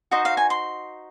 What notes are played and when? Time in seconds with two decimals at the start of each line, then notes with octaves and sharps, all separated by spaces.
0.11 D#4 F#4 C5 D#5
0.25 F5
0.37 G#5
0.50 C6